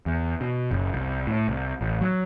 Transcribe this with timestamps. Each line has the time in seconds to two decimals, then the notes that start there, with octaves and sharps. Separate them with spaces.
0.06 E2
0.41 B2
0.71 F#1
0.93 C2
1.27 A2
1.49 C2
1.81 A1
2.01 F#3